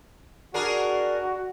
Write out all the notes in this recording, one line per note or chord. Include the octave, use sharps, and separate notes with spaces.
D4 F#4 G#4 A#4